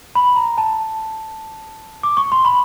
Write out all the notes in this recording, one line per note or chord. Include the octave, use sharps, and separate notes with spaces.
B5
A#5
A5
D6
C#6
C6
B5